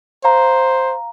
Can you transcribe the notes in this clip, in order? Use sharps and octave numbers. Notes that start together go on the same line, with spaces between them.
C5 F5 A#5